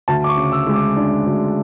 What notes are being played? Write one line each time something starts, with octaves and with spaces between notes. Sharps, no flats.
D2 A5
D6
C#6
C#3
E6
G#3
D6
D4
D2